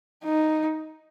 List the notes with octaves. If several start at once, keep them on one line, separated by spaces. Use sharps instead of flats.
D#4